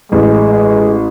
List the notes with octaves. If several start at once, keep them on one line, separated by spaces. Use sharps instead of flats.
A1 G#3